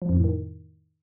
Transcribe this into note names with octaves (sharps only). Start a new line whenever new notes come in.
F3
F2
A2
D#3